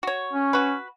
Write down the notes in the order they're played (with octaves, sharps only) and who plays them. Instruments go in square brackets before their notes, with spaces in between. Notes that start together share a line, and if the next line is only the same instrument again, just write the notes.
[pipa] F#4 C#5
[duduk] C#4
[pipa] F#4 B4